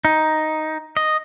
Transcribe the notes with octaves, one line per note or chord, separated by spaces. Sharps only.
D#4
D#5